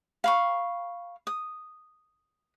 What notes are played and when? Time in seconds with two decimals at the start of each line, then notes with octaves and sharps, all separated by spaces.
0.24 F5 B5 C#6
1.27 D#6